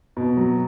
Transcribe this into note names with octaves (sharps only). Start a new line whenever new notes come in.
B2
F#3